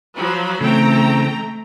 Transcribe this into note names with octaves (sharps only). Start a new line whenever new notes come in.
F3 F#3 B5
C#3 E3 A3 C4 A4 G5 A#5